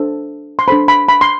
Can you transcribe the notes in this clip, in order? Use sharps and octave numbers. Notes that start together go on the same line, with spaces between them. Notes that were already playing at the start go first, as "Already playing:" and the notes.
Already playing: D4 A4 C5
C6
D4 A4 C5 B5
B5
B5
C6